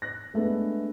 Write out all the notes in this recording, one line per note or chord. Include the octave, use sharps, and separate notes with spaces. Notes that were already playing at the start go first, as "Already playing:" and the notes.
F#6 A#6
G#3 A3 B3 D4